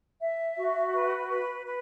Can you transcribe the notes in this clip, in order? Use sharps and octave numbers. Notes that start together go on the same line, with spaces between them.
E5
F#4
B4
B4
B4